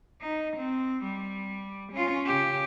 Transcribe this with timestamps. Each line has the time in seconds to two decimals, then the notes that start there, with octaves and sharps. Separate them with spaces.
0.21 D#4
0.57 C4
1.04 G3
1.92 C#4 F4
2.26 C#3 G4